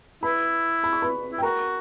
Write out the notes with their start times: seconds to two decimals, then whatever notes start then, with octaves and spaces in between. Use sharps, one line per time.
0.23 E4 B4 B5
0.84 B5
0.93 C#6
1.02 B4 B5
1.32 E4
1.38 G5
1.42 F#4 A#4 A#5